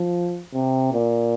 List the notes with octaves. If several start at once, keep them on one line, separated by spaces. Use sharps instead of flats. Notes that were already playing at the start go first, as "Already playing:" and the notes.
Already playing: F3
C3
A#2